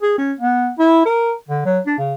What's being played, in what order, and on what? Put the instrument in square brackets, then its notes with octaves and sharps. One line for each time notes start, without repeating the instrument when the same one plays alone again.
[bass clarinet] G#4
C#4
B3
E4
A#4
D3
F#3
D4
C#3